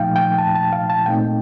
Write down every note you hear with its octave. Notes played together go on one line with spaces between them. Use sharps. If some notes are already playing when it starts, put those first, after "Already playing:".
Already playing: A#2 F3 A3 D#4 F5 G5
G5
A5
A5
F5
A5
A#2 A3 C4 D#4 G5